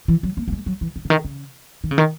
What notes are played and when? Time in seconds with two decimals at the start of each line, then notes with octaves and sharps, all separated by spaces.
0.08 E3
0.23 F#3
0.37 A#3
0.48 A#3
0.52 G#3
0.66 F#3
0.81 E3
0.96 D#3
1.05 C#3
1.10 D#3
1.25 C#3
1.84 D#3
1.91 C#3
1.98 D#3